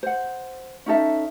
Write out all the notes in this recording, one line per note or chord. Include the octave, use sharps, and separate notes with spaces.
C5 F#5
C#4 D#4 A4 E5